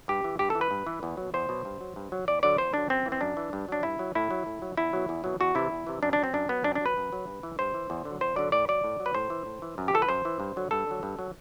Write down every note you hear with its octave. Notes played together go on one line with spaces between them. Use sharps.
G2 G4
E3
G2 G4
A4
E3
B4
G2
E3
E2
B2 F#3
E2 C5
B2 F#3
G2
F#3
G2
F#3
E2 D5
D3 F#3 D5
E2 C5
D3 F#3 D4
F#2 C4
E3
C4
F#2 D4
E3
G2
F#3 D4
G2 E4
F#3
A2 E4
F#3
A2
F#3
E2 E4
B2 F#3
E2
B2 F#3
E2 F#4
C3 E3 E4
E2
C3 E3
F#2 D4
D4
F#3
C4
F#2 D4
F#3 B3
F#2 D4
D4
F#3 B4
F#2
F#3
G2
E3
G2 C5
E3
E2
D3
F#3
E2 C5
D3 F#3 D5
A2 D5
F#3 D5
A2
F#3
B4
A2 C5
E3
A2
E3
F#2
G4
E3 A4
B4
F#2 C5
E3
G2
D3 F#3
G2 A4
D3 F#3
G2
F#3